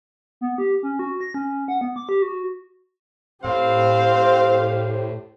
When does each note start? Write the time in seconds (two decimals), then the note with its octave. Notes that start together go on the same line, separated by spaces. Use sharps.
0.41 B3
0.58 G4
0.83 C#4
0.99 F#4
1.21 A#6
1.34 C#4
1.68 F#5
1.81 B3
1.96 D6
2.09 G4
2.22 F#4
3.45 A2 C4 G4 C5 F5